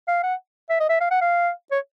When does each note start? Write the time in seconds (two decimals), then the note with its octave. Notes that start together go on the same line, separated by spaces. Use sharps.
0.08 F5
0.23 F#5
0.70 E5
0.80 D#5
0.89 E5
1.00 F5
1.11 F#5
1.21 F5
1.71 C#5